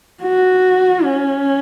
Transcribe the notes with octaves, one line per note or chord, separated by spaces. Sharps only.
F#4
C#4